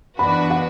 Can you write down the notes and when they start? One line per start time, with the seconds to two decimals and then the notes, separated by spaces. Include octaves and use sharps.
0.19 E3 B3 D4 F#4 B4 B5
0.50 F#5